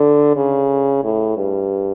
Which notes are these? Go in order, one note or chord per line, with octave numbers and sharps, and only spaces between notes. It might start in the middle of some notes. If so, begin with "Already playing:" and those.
Already playing: D3
C#3
A2
G2